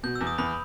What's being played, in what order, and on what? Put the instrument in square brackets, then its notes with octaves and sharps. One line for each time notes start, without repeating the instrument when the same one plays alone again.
[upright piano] B2 [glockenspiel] G6
[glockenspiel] E6
[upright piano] E2
[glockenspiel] D#6
[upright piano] E2 [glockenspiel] B5